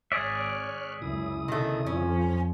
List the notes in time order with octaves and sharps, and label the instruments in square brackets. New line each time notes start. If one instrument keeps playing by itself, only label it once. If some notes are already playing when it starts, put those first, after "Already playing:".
[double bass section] G#1 [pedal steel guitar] G#4 D5 E5 [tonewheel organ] C#5 F6 F#6
[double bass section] C#2 F#2 [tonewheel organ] C#3 E4 D#6
[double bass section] B1 C3 [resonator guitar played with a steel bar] D#3 A3
[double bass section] F2 F3 [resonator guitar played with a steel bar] C#4